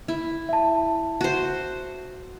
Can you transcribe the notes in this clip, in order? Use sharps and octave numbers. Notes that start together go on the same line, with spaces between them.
E4
E5 A5
F#4 C5